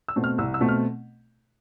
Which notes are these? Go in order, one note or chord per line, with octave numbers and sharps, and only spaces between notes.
E6
B2 A3 C4
F6
C2 E6
E6
B2 A3 C4
F6